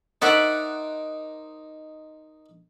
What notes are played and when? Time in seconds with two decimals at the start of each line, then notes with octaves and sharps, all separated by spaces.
0.22 D#4 A#4 C5 D5 E5 F#5